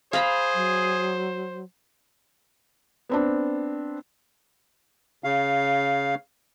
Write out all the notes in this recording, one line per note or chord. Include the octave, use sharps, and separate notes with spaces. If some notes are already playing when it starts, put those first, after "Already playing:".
G#4 C5 F5 A#5 B5
F#3
B3 C4 D4
C#3 F5